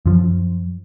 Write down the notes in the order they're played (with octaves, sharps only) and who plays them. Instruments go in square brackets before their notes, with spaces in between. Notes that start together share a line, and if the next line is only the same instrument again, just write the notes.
[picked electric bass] F#2 F3